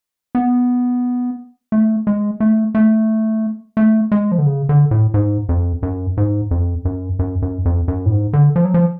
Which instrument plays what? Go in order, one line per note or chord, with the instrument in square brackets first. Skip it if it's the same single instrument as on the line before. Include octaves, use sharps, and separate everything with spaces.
[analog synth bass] B3
A3
G#3
A3
A3
A3
G#3
F3
D3
C#3
D3
A2
G#2
F2
F#2
G#2
F2
F#2
F#2
F#2
F2
F#2
A2
G#2
D3
F3
F#3
F3